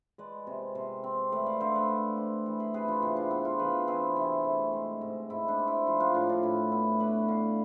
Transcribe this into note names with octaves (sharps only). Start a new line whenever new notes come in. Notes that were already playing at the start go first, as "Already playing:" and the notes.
G#3 B4 D5
C3
C3
C4
A3 B4 D5
D5 F5
D3 C5 E5
B4 D5
D3
C4
E3
G#4 B4
C3 G#4 B4
D4 F4
C3 E4
D4
B3 E4
F4 A4
E3 G#4 B4
C4 E4 G#4
C3 E4
A3
G#3
G#2
G#2 E4
D4
C4
E4
F3
D4 F4
A2 D4
D4
A2 E4
B3 E4
A3 B4 D5
D3 D5 F5